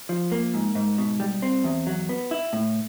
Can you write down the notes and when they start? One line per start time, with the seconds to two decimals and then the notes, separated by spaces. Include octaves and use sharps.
0.09 F3
0.32 A#3
0.54 G#2
0.75 G#2
0.98 B2
1.20 G3
1.42 C4
1.64 E2
1.87 F#3
2.09 B3
2.31 E4
2.53 A2